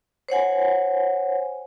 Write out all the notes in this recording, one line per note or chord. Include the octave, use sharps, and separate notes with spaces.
C5 C#5 F#5 G#5